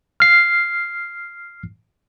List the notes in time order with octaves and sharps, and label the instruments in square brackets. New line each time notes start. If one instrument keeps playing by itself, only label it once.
[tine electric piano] F6 C7